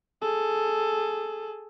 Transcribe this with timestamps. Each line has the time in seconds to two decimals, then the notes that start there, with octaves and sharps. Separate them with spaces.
0.22 G#4 A4